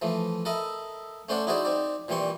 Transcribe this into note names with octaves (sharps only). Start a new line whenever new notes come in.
E3 F3 A3
A4 A#4 D#5 E5 B5
A3 C#4 C5 D5 F#5
D#4 E4 F#4 G#4 C5 D5
C4 D#4 D5
A#2 E3 G3 C4 C6 C#6